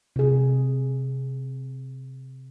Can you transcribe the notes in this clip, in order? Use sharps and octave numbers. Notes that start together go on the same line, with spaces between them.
C3 G#4